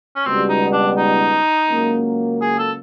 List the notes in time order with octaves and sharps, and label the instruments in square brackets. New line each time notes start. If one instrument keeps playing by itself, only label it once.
[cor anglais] C#4
[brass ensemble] C#2 B2 G3 [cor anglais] C4
[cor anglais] D#4
D4
D#4
[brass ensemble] C#2 C#3 F#3 A#3
[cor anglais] G#4
A4